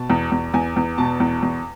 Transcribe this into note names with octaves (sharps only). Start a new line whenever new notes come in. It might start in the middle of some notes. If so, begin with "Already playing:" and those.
Already playing: B2 A5
E2
E2
E2 G#5
E2
B2 A5
E2
E2